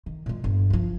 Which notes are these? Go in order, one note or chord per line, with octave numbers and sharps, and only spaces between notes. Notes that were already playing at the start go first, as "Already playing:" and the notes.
D#3
A#2 G#3
G1
D#3 F3